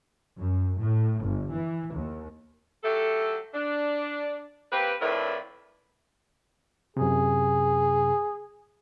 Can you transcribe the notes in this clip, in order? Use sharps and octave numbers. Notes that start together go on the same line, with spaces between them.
F#2
A2
G1
E3
D#2
F#3 A3 G4 A4
D4
A#3 C4 G4 B4
F2 A2 D4 A#4 B4
F#2 C3 G#4